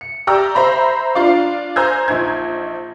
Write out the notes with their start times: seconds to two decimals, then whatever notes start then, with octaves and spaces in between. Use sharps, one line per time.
0.01 C#7
0.27 G4 D5 A#5 E6
0.55 C5 E5 A#5 B5
1.15 D4 F4 D5 F5
1.76 C5 G#5 A#5 E6 G6 G#6
2.08 A#1 D#4 G#6